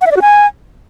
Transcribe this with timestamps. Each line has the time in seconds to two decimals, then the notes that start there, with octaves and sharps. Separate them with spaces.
0.01 F#5
0.06 E5
0.11 D5
0.16 F#4
0.22 G#5